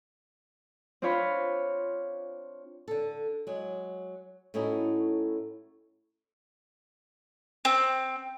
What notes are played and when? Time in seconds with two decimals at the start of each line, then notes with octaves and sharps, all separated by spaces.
1.02 C4 D4 F4 C#5 F5 B5
2.88 D3 A4
3.47 F#3 G#3
4.54 A2 A3 C#4 D#4 E4 F#4
7.65 C4